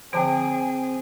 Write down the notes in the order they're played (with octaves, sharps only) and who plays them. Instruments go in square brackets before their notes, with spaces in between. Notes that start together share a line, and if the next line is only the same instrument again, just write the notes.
[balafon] D3 F3 C5 [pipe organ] C4 [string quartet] G#4 [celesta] G5 D7